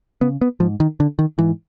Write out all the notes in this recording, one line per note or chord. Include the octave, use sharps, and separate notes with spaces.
C#3 B3
B3
G#2 F3
D#3
D3
D#3
G#2 E3